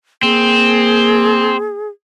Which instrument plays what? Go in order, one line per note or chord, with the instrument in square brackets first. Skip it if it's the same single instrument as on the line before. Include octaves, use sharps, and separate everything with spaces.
[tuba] A#3 [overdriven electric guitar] C4 [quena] G#4